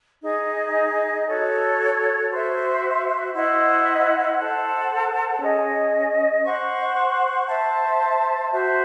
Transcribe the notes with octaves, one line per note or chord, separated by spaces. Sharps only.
D#4 G#4 D#5
F#4 A4 C#5
F#4 C5 E5
E4 C5 D#5 F#5
A4 C5 F#5
C#4 G#4 D#5
C5 F#5 C#6
C5 E5 A5
F#4 C5 E5